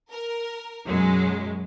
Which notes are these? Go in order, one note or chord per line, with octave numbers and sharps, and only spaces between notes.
A#4
F#2 B2 F#3 G#3